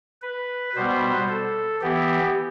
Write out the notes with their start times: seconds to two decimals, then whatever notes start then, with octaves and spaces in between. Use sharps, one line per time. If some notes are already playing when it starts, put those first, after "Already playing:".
0.22 B4
0.75 B2 G3 B3 C5
1.28 A4
1.81 E3 B3 G4